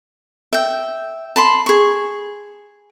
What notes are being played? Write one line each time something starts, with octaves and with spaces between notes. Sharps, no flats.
E5 G5
A5 B5 C6
G#4 C#6